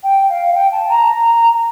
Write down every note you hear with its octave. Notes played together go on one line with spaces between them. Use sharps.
G5
F5
F5
G5
A5
A#5